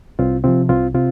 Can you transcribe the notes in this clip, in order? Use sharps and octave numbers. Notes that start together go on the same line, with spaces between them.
C2 C4 F4
C3 F3 C4 F4
C2 C4 F4
C3 C4 F4